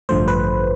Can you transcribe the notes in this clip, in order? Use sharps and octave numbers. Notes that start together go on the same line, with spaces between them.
A1 G2 D3 F3 A3 C5
B4